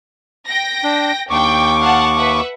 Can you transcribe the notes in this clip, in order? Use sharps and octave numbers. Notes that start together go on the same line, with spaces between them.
G5 A#6
D4
D#2 D4 G5 C#6 D6
F5 F#5 A5
B4 E5 F#5